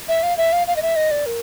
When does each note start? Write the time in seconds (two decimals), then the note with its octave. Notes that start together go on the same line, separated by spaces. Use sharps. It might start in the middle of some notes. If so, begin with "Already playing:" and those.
0.08 E5
0.23 F5
0.37 E5
0.53 F5
0.67 F5
0.76 D#5
0.82 E5
0.96 D#5
1.11 D5
1.26 A#4